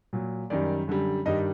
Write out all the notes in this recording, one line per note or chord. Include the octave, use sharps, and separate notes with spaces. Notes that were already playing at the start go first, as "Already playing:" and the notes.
A#2 F#3
F#2 D#3 G3 D5
F#2 D3 G3
G2 D#3 G3 D#5